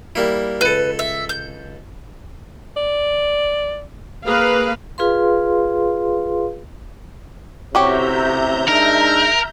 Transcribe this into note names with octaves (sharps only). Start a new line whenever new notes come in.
G3 A#3 E4
C#2 A4 B4
E5
G6
D5
A#3 G#4 B4 F5
F4 G#4 B4 F5 C6
A1 C3 F#4 G4 C#5 E5 A#5 G6
G#3 D4 D#4 A#4